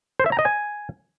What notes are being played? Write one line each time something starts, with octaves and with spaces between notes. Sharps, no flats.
C5
E5
A#5
D#5
G#5